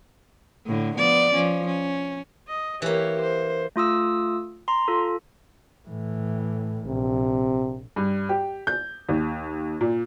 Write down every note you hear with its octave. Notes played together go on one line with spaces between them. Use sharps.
A2 D3
F3 B3 D5
F3 C#4
C#4
D#5
E3 A#3 G4 C#5
C5
A3 F4 D#6 E6
A#5 C6
F4 A4
A2 E3
A#1 C3
G2
G4
G6
D#2
A#2